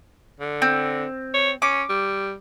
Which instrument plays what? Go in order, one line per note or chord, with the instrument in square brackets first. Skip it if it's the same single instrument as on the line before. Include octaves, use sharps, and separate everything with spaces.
[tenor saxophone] D3
[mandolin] C4
[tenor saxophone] C#5
[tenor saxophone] C#4 [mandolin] D6
[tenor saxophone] G3